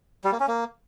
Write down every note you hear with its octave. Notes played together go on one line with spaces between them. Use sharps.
G3
A#3
C#4
A#3